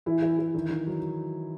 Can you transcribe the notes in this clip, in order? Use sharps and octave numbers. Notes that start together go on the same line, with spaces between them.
E3 E4
E3
E3
D#3
D#3
F#3